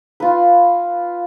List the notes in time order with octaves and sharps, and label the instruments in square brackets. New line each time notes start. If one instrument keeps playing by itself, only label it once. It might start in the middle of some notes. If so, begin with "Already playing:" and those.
[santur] F4 B4